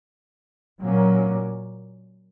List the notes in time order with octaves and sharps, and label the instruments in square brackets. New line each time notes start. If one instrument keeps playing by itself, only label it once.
[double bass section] A#2 F#3 A#3 C#4